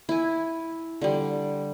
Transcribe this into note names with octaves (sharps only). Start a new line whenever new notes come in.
E4 G#5
D3 G3